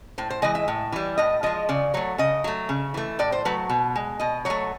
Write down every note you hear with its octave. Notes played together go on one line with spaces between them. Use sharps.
A2 C5
C5
E3 G#3 D#5
E5
A2
E3 G3
A2 D#5
F3 G#3 D#5
C#3 D5
F#3 A3 C#5
C#3 D#5
F#3 A3
C#3
E3 A3
A2 D5
C5
F#3 A3 B4
B2
G#3
B2 D#5
F#3 A3 C#5